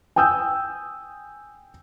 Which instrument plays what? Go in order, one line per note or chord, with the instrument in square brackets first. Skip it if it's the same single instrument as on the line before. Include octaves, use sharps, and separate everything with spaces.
[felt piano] G5 G#5 D#6 E6 G6